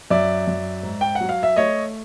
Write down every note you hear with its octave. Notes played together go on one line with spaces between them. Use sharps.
F#2 D5 E5
F#2
G#2
G5
F#5
F#3
F5
E5
A3 C#5 D#5